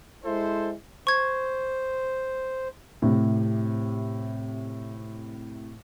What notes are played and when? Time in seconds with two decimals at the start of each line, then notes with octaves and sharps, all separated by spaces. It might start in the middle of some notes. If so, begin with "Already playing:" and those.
0.24 G#3 E4 A4 C5
1.07 C5 C#6 G#6
3.02 A2 C3